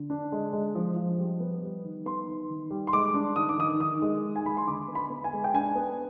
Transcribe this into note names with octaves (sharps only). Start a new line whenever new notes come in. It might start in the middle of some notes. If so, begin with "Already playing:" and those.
Already playing: D3
D4
G#3
G#3
F3
F3
G3
B3
G3
D#3
B3 C6
D#3
D#3
G3
C6
G#3 D6
D4
D#3 D#6
D6
D#3 D#6
D#3 D#6
G#3
D#3
G#5
G#3 B5
C6
D3 D6
B3
B5
B3
G#5
G#3
G5
D4 G#5
B3